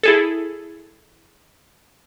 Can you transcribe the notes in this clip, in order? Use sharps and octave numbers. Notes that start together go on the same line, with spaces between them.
E4 G#4 A4